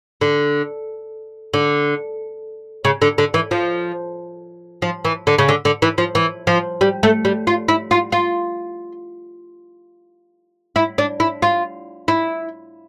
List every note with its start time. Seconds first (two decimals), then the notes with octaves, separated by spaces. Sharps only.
0.21 D3
1.54 D3
2.85 C#3
3.02 D3
3.18 D3
3.34 E3
3.51 F3
4.82 F3
5.05 E3
5.27 D3
5.38 C#3
5.48 D3
5.65 D3
5.82 E3
5.98 F3
6.15 E3
6.47 F3
6.81 G3
7.03 A3
7.25 G3
7.47 F4
7.68 E4
7.91 F4
8.12 F4
10.76 E4
10.98 D4
11.20 E4
11.42 F4
12.08 E4